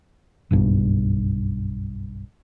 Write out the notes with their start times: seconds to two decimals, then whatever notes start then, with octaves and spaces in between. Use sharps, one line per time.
0.51 F#1 B1 G2